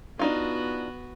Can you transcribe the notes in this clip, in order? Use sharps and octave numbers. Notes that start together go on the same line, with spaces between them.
B3 D4 D#4 F4 F#4